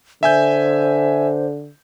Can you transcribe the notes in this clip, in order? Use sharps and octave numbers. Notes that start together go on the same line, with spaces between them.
D3 C5 E5 G#5 G6